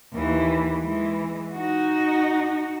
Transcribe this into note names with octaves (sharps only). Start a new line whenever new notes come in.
D#2 E3
E3 G#3
D#4 F#4